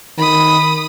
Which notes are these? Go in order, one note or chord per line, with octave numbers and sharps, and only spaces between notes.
D#3 B5 D#6